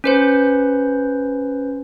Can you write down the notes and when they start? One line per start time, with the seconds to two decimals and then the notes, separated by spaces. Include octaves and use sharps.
0.04 C#4 B4 C5